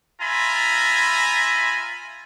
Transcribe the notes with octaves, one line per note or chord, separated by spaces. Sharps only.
F4 E5 G#5 A#5 B5